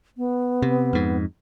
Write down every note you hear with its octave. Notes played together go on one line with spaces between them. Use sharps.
B3
C3
F2 G#2